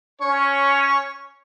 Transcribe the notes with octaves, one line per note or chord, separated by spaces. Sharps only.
C#4 C#5